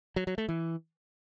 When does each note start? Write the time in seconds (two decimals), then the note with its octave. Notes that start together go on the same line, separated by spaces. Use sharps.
0.16 F#3
0.27 F#3
0.38 A3
0.48 E3